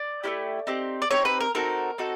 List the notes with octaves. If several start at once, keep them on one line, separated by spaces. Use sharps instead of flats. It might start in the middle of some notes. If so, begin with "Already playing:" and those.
Already playing: D5
A3 C#4 E4 G4
C4 D#4 G4
D5
C4 D#4 G4 C#5
B4
A#4
C4 D#4 F#4 A4 A#4
C4 D#4 F#4 A4